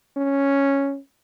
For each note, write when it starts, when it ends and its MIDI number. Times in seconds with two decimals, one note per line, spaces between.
0.17 0.99 61